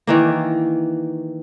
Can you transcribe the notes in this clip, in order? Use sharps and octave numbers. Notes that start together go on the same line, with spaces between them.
D#3 E3 A#3